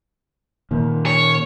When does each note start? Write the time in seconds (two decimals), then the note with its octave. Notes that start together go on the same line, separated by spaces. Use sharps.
0.71 A#2 D#3 A#3
1.06 C#5